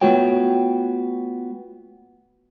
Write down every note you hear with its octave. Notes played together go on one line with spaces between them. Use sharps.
A3 B3 F4 F#4 C#5 G5